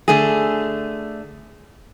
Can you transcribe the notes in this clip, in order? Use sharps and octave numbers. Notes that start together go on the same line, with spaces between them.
D3 A3 G#4